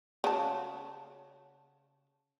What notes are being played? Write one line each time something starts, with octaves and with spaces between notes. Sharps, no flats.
C#3 F#4 A5